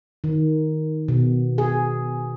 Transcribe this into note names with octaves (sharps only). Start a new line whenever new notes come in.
D#3
B2
G#4